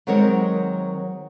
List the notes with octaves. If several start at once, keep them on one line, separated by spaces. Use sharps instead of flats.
D#3 F#3 G#3 C4 A#4 C#5